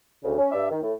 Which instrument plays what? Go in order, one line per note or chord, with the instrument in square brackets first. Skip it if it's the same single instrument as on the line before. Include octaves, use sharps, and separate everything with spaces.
[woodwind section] D2 C#3
C#4
G2 D5 E5
D#3
A2